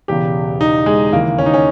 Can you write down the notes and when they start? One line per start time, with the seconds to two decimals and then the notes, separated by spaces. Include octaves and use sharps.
0.08 E1 E2 C#3 G4
0.61 D#4
0.86 G#3
1.12 D#2 C#3 E3 A#3
1.38 C#4
1.46 D#4
1.54 C#4